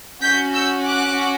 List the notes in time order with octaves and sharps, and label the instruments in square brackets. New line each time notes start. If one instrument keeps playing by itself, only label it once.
[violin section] C#4 F#4 G6 B6
E6 G6
D6 F#6